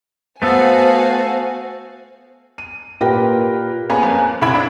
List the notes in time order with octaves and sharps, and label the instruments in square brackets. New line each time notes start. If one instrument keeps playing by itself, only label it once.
[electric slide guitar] A3 B3 A4 [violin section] F#4 F5 G#5 [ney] C5
[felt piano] D#7
A#2 G4 A#4 B4 G5 A#6
[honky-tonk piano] A#3 B3 C#4 G#4 A#4 B4
F2
F#6
C2 C#3 E4 B5 G#6 D7
D4